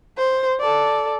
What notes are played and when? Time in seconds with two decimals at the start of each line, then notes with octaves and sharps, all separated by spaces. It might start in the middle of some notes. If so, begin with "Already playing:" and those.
0.17 C5
0.60 A4 D5